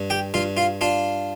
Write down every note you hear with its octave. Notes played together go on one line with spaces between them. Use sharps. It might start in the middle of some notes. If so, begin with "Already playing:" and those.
Already playing: G2
G4 G5
G2 F4 F5
F4 F5
D4 F4 F5